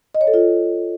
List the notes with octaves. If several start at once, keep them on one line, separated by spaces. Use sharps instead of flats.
D#5
C#5
A4
F4